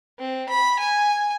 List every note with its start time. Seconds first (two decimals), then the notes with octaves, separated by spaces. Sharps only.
0.19 C4
0.49 B5
0.79 G#5